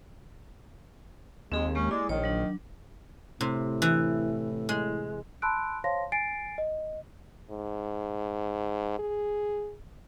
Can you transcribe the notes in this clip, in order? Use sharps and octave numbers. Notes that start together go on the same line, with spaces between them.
D#2 G#3 C4 G#4 C6
G#3 A#3 C#4 G4
G#3 E4 D5
A#1 D#3 C#5
F#3 D4
A2 C3
E3
G#3
A5 B5 C6 E6 F#6 D7
C5 C#5 F5 A5 C6 A#6
G#5 A6 C7 D7
D#5
G#2
G#4